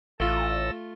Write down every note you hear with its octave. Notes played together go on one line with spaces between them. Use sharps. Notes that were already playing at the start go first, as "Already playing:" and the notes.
A1 A3 F4 A4 E6 A#6